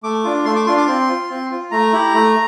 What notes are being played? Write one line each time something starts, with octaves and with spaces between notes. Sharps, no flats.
A3 D6
D4 F4
A3 C6
D6
D4 F4 C6
D6
C4 C6
F4
C4
F4
A3 A#5
E4 G4
A3